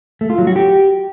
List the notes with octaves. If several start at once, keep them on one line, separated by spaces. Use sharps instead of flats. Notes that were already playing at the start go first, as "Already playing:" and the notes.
A3
F4
F#3
F#4
G4